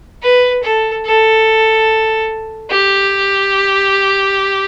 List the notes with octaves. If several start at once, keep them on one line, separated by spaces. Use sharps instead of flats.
B4
A4
A4
G4